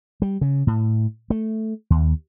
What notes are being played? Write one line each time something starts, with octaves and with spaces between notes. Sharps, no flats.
G3
C#3
A2
A3
D#2